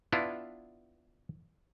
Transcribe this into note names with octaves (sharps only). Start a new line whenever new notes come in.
B3 D4 E4 F4